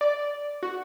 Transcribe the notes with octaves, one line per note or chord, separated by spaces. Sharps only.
D5
F#4